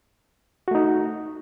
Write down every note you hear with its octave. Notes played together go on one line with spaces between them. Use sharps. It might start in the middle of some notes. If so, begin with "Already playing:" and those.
A3 D#4 F#4